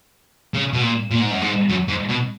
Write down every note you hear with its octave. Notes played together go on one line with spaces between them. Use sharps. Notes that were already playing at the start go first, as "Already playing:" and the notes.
C#3
B2
A#2
A#2
G#2
F#2
G#2
F#2
G#2
B2